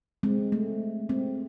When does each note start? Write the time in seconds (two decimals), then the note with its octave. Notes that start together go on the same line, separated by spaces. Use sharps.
0.23 G#3 C4
0.52 A3
1.09 G#3 C4